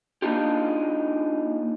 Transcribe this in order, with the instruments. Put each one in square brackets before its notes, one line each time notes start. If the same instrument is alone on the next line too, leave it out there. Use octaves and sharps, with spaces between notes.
[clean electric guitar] A#3 D4 D#4 F4 G4